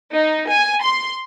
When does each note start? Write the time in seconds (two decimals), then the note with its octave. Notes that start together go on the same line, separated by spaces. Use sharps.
0.14 D#4
0.49 G#5
0.83 C6